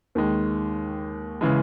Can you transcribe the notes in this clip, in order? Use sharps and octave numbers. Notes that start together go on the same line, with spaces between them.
D#2 D#3 G#3
C#3 E3 G#3